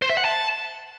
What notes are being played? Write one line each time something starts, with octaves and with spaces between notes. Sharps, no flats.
C5
E5
F#5
A5